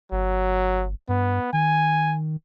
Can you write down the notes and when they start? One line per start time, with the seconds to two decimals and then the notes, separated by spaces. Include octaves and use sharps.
0.12 G1 F#3
1.08 G2 B3
1.53 D#3 G#5